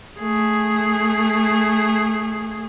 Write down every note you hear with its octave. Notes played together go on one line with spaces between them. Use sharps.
A3 G#4